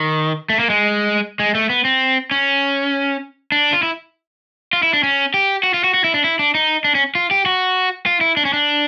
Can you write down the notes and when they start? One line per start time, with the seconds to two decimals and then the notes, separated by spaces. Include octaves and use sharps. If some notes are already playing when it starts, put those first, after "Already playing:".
Already playing: D#3
0.50 A3
0.59 A#3
0.70 G#3
1.40 G#3
1.55 A3
1.70 B3
1.85 C4
2.31 C#4
3.52 D4
3.73 F4
3.83 E4
4.73 F4
4.83 E4
4.94 D4
5.03 C#4
5.34 G4
5.63 F#4
5.74 F4
5.84 F#4
5.94 F#4
6.04 E4
6.14 D4
6.24 E4
6.39 D4
6.55 D#4
6.85 D4
6.95 C#4
7.15 F4
7.31 G4
7.46 F#4
8.06 F4
8.21 E4
8.37 D4
8.45 C#4
8.53 D4